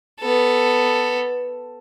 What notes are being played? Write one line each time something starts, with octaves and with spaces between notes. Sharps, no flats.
B3 A4